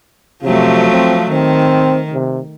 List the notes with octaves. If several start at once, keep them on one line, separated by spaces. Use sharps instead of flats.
C3 F3 F#3 A3
C4
D#3 C4
C3